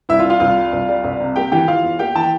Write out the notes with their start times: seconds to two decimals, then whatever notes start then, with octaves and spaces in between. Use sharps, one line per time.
0.09 C2 E4 E5
0.19 F4 F5
0.24 C2
0.30 F4 F5
0.40 C2 F4 F5
0.57 G3
0.72 C2
0.88 G3
1.04 C2
1.20 C3
1.36 A#3 G4 G5
1.52 E3 G4 G5
1.67 E3 F4 F5
1.83 E2
1.99 A#3 G4 G5
2.15 E3 A5
2.23 G5